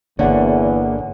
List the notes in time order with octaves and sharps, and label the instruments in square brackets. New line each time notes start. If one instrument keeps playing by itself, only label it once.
[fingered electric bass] G1 D3 [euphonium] E2 [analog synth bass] A#3 [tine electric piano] C#5 D5 F#5